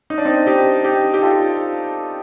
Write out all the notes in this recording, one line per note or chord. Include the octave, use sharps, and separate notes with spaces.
D#4
D4
C4 D#4
D#4 G4
D#4 G4
G4
F4 A4